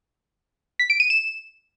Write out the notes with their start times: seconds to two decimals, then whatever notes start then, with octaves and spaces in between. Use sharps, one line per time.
0.79 B6
0.90 D7
1.00 D#7
1.10 E7